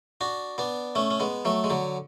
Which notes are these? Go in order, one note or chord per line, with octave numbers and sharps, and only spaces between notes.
D4 F#4
B3 D4
A3 C#4
C#4
G#3 B3
F#3 A3
G#3
D3 F#3